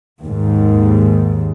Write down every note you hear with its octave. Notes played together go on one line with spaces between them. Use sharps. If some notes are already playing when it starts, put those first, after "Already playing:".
D#2 G#2